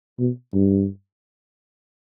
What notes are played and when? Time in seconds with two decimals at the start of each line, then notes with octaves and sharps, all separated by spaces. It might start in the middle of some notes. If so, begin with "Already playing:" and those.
0.19 B2
0.53 G2